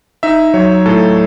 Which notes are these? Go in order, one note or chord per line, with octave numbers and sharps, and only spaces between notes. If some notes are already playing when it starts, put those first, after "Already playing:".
D#4 E5
F#3 C#5
A2 A4